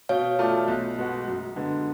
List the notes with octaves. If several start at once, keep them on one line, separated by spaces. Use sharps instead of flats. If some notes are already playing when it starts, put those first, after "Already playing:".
B2 C#5 F5
A3 F4 A4 D5
B1
B2 G#3 B3 F#4
F#2
D3 G#3 B3